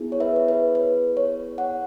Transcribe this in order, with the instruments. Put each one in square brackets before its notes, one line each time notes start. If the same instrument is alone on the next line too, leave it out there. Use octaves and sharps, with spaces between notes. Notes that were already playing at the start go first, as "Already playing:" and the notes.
Already playing: [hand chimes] B3 E4 G#4
C#5
B4 E5
C#5
B4
B4
C#5
C#5 F#5